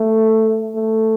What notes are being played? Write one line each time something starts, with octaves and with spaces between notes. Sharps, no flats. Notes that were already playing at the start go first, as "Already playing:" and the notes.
Already playing: A3
A3